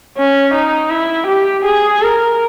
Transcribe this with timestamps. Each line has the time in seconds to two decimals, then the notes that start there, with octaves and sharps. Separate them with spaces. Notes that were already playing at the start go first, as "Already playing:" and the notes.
0.17 C#4
0.54 D#4
0.90 E4
1.27 G4
1.66 G#4
2.02 A#4